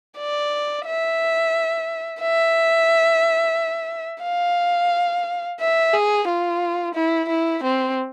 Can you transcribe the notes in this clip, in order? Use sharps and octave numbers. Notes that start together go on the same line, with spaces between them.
D5
E5
E5
F5
E5
G#4
F4
E4
E4
C4